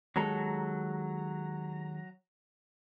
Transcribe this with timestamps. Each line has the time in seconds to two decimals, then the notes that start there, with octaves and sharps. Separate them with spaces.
0.16 D#2 F#3 G#3 A4 A#5